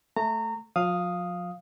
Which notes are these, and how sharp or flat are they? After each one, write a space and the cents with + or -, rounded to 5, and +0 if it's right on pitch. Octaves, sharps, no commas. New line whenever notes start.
A3 +0 A#5 -25
F3 +40 F5 +0 D#6 +0